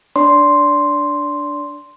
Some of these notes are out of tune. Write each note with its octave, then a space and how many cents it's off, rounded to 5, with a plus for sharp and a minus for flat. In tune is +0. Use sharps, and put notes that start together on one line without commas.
D4 +0 D5 -30 C6 +0